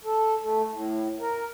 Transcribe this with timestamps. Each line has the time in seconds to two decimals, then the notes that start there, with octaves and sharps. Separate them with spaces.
0.04 A4
0.41 A3
0.72 A2
1.20 A#4